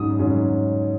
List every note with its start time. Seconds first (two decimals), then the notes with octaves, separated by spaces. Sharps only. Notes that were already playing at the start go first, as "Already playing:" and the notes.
Already playing: G#2 F#3 C#4 D#6
0.19 G#2 F#3 C#4